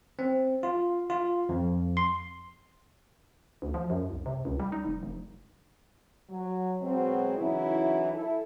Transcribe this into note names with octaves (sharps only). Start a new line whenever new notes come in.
C4
F4
F4
F2
C6
D2
F3
F#2
C2
C3
C#2
G3
D#4
F1
F1
F#3
B2 F#3 G#3 C4
C#3 E3 F#3 D#4 E4
E4 A4